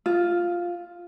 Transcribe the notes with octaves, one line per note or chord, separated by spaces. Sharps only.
F4